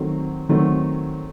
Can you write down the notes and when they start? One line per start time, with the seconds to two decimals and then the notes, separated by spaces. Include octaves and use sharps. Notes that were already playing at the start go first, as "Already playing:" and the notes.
Already playing: D#3 F#3 A3 C4
0.49 D#3 F#3 A3 C4